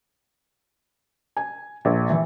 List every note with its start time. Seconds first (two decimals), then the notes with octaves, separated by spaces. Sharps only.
1.37 G#5
1.85 A#1
2.10 E3